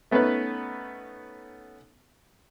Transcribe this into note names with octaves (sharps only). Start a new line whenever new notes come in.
A3 B3 C#4 D#4 B4